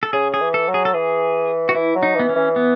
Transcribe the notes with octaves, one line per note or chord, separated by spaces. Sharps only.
A4
C#3 G#4
G#4
E3
A4
F#3
G#4
A4
E3 G#4
F#4
E3 E4
F#3
D#4
E3 B3
C#4
E3
B3